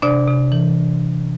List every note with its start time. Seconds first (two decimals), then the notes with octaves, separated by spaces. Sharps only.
0.02 C3 D4 D5
0.27 C3
0.52 E3